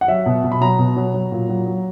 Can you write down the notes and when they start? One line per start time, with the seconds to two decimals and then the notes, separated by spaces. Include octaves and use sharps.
0.01 F#5
0.08 F#3 E5
0.26 B2
0.44 B2
0.52 B5
0.61 F#3 A#5
0.79 B2
0.97 F#3
1.14 F#3
1.32 A#2
1.49 F#3
1.67 F#3